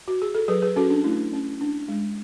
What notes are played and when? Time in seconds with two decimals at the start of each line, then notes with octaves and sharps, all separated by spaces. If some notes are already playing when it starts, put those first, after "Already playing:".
0.08 F#4
0.22 G#4
0.35 A4
0.48 F#3 G#4 B4
0.62 G#4 B4
0.76 C#4 F#4 A4
0.90 D4
1.04 A3 E4
1.33 C#4
1.61 D4
1.89 G#3